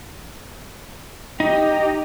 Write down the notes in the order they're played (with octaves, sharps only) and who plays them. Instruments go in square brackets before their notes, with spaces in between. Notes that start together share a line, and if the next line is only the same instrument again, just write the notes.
[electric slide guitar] D#4 [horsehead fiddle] G4 D#5